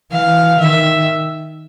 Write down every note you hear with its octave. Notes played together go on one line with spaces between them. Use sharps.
E3 F5
D#3 E5